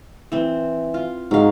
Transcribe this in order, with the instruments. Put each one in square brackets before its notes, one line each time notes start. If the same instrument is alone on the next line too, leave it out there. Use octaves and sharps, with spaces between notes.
[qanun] E3 C4
F4
[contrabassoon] G#2 [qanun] F#3 F5